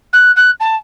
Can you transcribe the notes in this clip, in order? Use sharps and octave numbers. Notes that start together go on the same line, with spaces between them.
F#6
F#6
A5